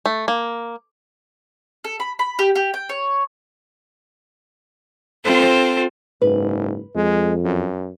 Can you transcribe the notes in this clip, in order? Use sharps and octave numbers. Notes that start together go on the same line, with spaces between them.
A3
A#3
A4
B5
B5
G4
G4
G5
C#5
C4 F4 A4 C5
F#1 G#2 B4
F2 G#3
F#2